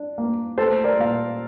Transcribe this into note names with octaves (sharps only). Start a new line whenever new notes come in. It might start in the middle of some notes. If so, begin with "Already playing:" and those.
Already playing: D4
A#3
A3 A4 C5
A#4 D5
A#2 F5